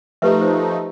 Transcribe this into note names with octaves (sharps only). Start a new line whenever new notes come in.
F3 A3 D#4 G4 B4 E5
C5